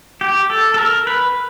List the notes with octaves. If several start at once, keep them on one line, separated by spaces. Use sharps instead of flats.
G4
A4
A4
A#4
B4